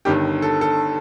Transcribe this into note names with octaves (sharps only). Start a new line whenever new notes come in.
G1 G2 D#3 G4
A4
A4